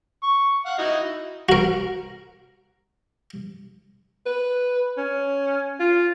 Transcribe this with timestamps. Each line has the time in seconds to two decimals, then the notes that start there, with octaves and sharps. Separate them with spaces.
0.23 C#6
0.65 F5 F#5
0.79 D#4 E4 F#4
1.49 F#4 A#4
4.26 B4
4.97 C#4
5.80 F4